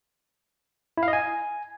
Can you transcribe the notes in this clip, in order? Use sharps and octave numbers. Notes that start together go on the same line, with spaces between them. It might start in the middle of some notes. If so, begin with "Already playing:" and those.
E4
F5
D#5
G#5